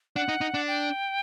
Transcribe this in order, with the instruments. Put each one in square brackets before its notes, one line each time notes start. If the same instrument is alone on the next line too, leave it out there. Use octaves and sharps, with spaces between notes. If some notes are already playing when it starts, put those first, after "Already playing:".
[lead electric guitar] D4 [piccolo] F#5
[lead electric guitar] D#4
D#4
D4
[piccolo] G5